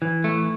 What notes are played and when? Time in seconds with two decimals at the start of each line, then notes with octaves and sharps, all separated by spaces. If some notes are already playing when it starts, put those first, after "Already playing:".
0.02 E3
0.24 A3